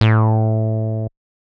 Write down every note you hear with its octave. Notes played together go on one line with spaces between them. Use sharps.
A2